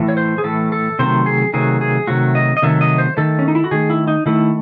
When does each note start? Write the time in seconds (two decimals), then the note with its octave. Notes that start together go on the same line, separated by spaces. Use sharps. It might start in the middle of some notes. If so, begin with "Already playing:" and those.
Already playing: A2 E3 A3
0.09 C#5
0.17 C5
0.38 G#4
0.44 A2 E3 A3 A4
0.72 A4
0.99 C3 D#3 F#3 A3 C5
1.26 G#4
1.53 C3 D#3 F#3 A3 G#4
1.81 G#4
2.07 C3 D#3 F#3 A3 F#4
2.35 D#5
2.57 D#5
2.62 C3 D#3 F#3 A3 E5
2.81 D#5
2.98 C5
3.17 D#3 A3 A4
3.39 C#4
3.48 D#4
3.55 E4
3.64 F#4
3.71 D#3 A3 G#4
3.90 E4
4.07 D#4
4.26 D#3 A3 E4